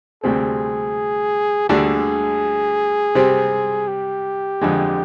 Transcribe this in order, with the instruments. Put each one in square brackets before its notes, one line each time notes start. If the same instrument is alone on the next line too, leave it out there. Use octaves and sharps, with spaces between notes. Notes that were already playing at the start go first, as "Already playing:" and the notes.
[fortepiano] D2 C3 G3 C4 [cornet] G#4
[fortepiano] D2 D3 G3 D4 [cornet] G#4
[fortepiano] C3 G3 C4
[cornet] G4
[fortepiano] F2 D3 G#3